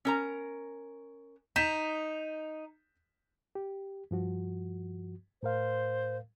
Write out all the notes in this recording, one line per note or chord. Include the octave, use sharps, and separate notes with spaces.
C#4 A#4 A#5
D#4 G6 B6 E7
G4
G2 F3 F#4
A2 A#4 C5 F5